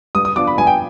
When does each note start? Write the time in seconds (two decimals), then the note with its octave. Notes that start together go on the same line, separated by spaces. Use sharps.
0.15 G2 D#6
0.25 D#6
0.36 F3 B3 D4 F4 D6
0.47 B5
0.58 G2 G#5
0.67 G5